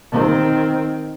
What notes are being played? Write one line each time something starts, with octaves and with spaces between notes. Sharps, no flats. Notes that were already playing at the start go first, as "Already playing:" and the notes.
D#3 C4